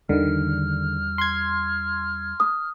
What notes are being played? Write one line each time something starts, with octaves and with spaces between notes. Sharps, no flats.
E2 D3 D#3 G3 F6
C6 G#6
D#6